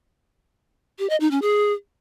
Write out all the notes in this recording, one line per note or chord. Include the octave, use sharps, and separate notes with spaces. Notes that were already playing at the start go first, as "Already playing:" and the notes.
G4
D#5
D#4
C#4
G#4